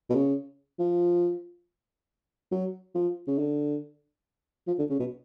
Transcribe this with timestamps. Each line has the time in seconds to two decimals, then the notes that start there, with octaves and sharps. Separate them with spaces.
0.10 B2
0.15 C#3
0.79 F3
2.51 F#3
2.95 F3
3.27 C#3
3.38 D3
4.67 F3
4.79 D3
4.90 C#3
4.99 B2